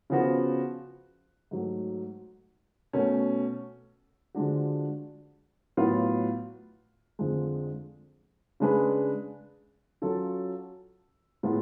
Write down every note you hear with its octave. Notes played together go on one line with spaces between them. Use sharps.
C#3 F3 B3 F#4
G#2 F#3 A3
B2 A3 C#4
D3 F3 G#3 D4 F#4
A2 F#3 B3 F4
F2 D3 F3 G#3
C#3 G#3 D4 G#4 B4
F#3 C#4 F4 A4
A2 G#3 B3 F4